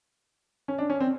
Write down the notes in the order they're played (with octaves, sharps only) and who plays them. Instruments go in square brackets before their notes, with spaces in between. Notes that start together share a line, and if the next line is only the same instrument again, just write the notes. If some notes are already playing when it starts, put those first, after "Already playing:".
[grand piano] C#4
D4
C#4
C4